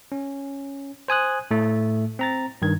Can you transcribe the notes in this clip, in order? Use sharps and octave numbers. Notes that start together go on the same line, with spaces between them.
C#4
C5 G#5 D#6 F#6
A2 A3
C4 A#5 A6
G2 D#3 G#6